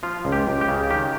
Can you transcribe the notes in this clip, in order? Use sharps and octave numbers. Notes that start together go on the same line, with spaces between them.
F3 F4
C#2
G4
C#2
G4
C#3
D#3 G4